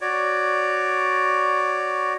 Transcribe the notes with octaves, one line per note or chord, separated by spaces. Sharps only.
F#4 C#5 D5